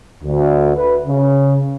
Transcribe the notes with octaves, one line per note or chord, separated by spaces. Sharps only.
D2
B4
C#3